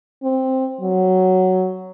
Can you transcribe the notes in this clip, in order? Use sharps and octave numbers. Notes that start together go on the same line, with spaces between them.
C4
F#3